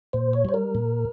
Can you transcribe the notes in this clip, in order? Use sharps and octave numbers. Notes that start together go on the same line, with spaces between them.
A#2 C5
C#5
G3 C5
A#4
A#2